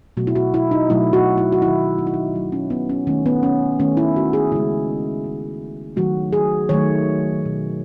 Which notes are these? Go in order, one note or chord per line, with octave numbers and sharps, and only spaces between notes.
B2 F#3 A3 F#4
E4
F#4
E4
D#4
B2 F#3 A3 E4
F#4
E4
F#4
D#3 F#3 A3 E4
D#4
E4
D#4
D#3 F#3 A3
C#4
B3
C#4
D#3 A3 C#4
B3
C#4
D#3 A3 C#4
E4
F#4
G#4
C#3 G#3 E4
C#3 G#3
D#3 F#3 A3 F#4
G#4
D#3 F#3 A3 C#5
B2 A3